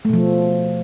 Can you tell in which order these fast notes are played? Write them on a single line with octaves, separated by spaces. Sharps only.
A3 B2 F3